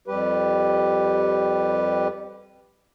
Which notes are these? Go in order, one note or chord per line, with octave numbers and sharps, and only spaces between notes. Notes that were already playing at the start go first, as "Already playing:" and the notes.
F2 G3 G4 B4